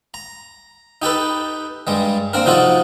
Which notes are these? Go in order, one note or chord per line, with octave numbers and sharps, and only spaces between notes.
A#5
D#4 G4 A4 B4
G2 G3 G#3
A#3 C4 D4 A#4
C3 F3 D#4 F4 F#4 A4